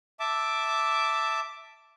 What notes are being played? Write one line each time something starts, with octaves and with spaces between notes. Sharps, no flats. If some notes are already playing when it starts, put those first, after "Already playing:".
E5 A5 D6